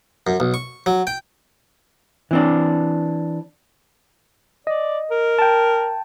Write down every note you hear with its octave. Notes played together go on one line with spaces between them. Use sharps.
F#2
B1
C#6
F#3
G5
E3 C4 D4
D5 D#5
A#4
G5 A5